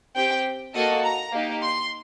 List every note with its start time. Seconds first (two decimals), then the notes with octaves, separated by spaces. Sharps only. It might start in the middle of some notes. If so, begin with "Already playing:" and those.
0.15 C4 G4 G5
0.74 A#3 F#4 A4 D#5
1.04 A#5
1.33 A#3 D#4 G4
1.62 C6